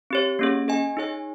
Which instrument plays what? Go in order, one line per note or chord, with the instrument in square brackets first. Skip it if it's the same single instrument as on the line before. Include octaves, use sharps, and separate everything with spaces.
[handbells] C4 G4 C#5
A#3 C#4 G#4
G#4 D#5 G#5
D#4 G#4 C#5 G#5